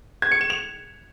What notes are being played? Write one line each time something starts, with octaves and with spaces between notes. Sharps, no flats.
G#6
C#7
E7
F7